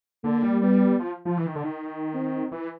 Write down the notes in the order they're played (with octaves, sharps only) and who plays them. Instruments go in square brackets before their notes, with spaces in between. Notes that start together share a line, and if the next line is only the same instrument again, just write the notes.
[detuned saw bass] D3 [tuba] A#3
[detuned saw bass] G3
[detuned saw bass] G3 [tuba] B3
[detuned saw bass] F3
F3
E3
D#3
D3
D#3
[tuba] C4
[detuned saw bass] E3